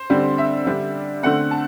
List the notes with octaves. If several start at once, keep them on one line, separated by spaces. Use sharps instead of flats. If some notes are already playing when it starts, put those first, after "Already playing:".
Already playing: C5
D3 G3 C4
E5
D3 G3 D4
D3 A3 C4 F#5
A5